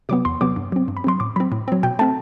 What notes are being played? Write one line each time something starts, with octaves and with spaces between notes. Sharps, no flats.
C3 F#3 B3 D6
E2 C6
C3 F#3 B3 D6
G2
F#3 C4
G2
B5
F#3 C4 C6
A2 D6
F#3 C4 B5
A2
F#3 C4
B2 G5
A3 C4 A5